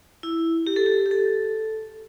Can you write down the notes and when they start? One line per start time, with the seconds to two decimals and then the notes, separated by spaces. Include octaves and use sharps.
0.23 E4
0.67 G4
0.76 A4
0.86 G4
1.06 G4
1.11 A4